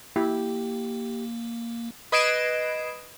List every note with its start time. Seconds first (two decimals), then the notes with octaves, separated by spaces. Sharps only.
0.16 A#3 E4 G4
2.12 B4 D#5 G#6 C7 D7 E7